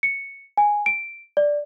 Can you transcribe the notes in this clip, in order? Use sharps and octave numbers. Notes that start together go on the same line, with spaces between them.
C#7
G#5
D7
D5